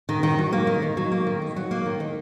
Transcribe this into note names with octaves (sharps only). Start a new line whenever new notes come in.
D#3
D#3
F#3
A#3
D#3
D#3
F#3
A#3
D#3
D#3
F#3
A#3
D#3
D#3